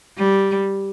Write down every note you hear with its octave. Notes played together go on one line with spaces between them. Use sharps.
G3